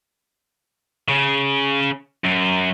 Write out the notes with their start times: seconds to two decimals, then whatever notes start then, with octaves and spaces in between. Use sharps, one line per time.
1.09 C#3
2.24 F#2